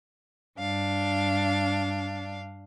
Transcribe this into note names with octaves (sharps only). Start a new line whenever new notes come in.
G2 D4 F5